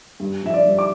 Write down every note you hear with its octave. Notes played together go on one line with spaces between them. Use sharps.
G2
F3 E5
D5
G2
D6